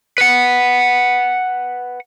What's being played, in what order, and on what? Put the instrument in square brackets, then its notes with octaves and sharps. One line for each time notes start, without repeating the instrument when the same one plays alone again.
[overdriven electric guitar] B4 F#5